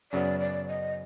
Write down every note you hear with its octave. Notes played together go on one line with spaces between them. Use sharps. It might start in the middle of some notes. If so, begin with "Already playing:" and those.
F#2 C#3 F#3 B3 D5
D5
D#5